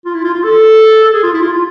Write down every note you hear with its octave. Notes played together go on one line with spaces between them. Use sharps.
F4
E4
F4
F4
A4
A4
G#4
F4
E4
F4
F4